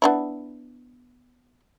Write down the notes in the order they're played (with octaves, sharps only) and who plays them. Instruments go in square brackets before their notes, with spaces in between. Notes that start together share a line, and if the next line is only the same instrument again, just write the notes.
[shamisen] B3 D4 E4